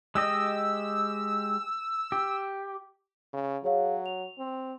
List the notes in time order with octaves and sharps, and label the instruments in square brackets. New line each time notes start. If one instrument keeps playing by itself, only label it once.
[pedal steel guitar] G#3 G4 D#5 [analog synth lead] E6
[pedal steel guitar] G4
[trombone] C#3
[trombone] F#3 [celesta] G#4 C#5 F5
[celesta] F7
[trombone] C4